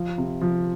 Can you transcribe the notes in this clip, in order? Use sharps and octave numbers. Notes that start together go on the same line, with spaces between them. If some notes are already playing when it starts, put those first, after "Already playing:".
Already playing: F3 F4
C3
F3